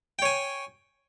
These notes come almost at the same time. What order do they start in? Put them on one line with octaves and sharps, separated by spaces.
G5 C#5 G#5